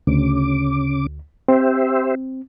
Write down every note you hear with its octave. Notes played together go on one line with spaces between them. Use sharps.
D2 C#3 D6
C4 G4 C5 E5